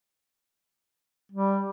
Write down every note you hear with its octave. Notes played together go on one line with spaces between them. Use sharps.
G3